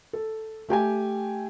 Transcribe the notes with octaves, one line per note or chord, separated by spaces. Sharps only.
A4
A3 G4 G5 G#5